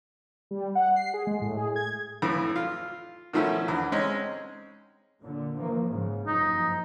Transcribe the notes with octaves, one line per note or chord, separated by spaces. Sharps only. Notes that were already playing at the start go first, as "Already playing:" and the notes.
G3
F#5
C7
G#4
G#3
A2
G#4
G#6
F2 A2 E3
F4
B2 D#3 F3 A3 C#4 E4
E2 D3
G#3 C4 C#4 D#4
A#2 D3
F3 A#3
G#2 C#3
F#1 G2 F3 D#4